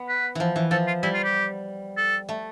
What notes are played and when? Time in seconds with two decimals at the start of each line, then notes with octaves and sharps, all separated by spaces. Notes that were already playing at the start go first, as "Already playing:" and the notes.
Already playing: B3
0.08 B4
0.35 E3 F3
0.56 E3
0.71 F3 A4
0.87 F4
1.03 G3 E4
1.14 F4
1.24 G4
1.97 A4
2.29 A3